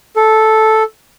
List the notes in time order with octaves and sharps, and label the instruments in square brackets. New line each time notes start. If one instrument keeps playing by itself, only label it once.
[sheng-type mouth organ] A4